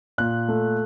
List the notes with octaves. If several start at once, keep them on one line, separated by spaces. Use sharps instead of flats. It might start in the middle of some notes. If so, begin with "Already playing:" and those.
A#2 F#6
A3